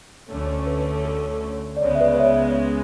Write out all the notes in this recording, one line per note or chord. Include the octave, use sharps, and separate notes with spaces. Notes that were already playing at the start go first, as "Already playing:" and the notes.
D2 D3 A3 C#4
C#5
B4
A4
D5
C#2 C#3 G#3 B3 C#5
E5
B4 D5
C#5 E5